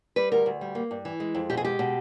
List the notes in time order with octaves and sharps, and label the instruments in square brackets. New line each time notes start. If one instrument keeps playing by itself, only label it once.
[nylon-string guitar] G3 B4
D2 A#4
D2
G3
A#3
G2
E3
G#3
F2
B2 G4
G#4
G#3 G4
B2